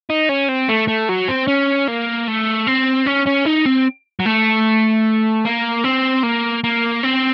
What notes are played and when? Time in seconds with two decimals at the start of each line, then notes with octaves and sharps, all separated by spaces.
0.10 D#4
0.29 C#4
0.48 C4
0.69 A3
0.88 A3
1.09 F#3
1.28 C4
1.48 C#4
1.88 A#3
2.27 A3
2.67 C4
3.07 C#4
3.27 C#4
3.46 D#4
3.66 C4
4.20 F#3
4.26 A3
5.45 A#3
5.84 C4
6.23 A#3
6.64 A#3
7.03 C4